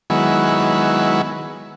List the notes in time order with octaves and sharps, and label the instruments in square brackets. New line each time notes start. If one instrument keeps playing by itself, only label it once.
[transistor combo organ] D#3 F#3 G#3 B3 E4